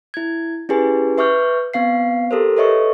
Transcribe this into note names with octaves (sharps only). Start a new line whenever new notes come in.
E4 G#6
C#4 E4 G4 G#4 B4 G#5
B4 E5 C#6 D6 F6 G6
B3 C4 F5 C7
G4 A4 A#4 C5
A4 B4 C#5 D#5 E5 C#6